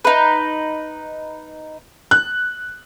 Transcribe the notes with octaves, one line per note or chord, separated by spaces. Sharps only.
D#4 B4
F#6